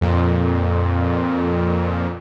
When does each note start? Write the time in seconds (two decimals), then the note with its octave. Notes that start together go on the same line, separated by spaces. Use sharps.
0.01 F2 A#2